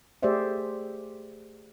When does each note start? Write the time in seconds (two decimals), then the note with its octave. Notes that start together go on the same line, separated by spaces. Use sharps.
0.23 A3 G4 G#4 C5 D5 E5